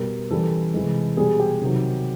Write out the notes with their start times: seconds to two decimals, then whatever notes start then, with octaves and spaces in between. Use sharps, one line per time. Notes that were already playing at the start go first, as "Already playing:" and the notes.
Already playing: B2 G3 A#4
0.30 C#3 E3 G3 A4
0.74 C3 E3 G#3
1.17 B2 G3 G#4
1.40 G4
1.61 C3 D#3 F#3